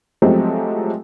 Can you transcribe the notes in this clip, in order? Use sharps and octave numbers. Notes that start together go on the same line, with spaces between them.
F3 F#3 G#3 A3 C4 G4